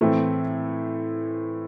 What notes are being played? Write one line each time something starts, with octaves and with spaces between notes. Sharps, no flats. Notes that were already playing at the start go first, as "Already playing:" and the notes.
A2 E3 A3 C4